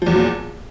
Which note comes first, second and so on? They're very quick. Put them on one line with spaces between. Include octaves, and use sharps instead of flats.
F3 E2 F#3 A#2